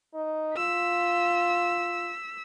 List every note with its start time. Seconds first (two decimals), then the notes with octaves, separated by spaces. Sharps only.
0.14 D#4
0.57 F4 E6 B6